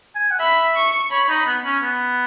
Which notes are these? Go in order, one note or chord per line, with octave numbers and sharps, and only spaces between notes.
G#5
F#5
E5 B5
C#6
C#5 B5
D#4
B3
C#4
B3